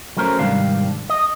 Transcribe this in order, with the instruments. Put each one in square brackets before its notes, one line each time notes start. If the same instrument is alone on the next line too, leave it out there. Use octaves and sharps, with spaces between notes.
[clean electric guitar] F#3 A3 C#4 A#4 C5
C2 G#2 D#3 G3 D4 F5
D#5